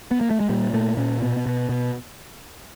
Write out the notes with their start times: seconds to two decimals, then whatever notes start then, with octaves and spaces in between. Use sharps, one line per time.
0.11 B3
0.21 A#3
0.31 A3
0.40 G#3
0.49 A#2 G3
0.73 A#2 A3
0.97 A#2 C#4
1.22 B2
1.46 B2
1.69 B2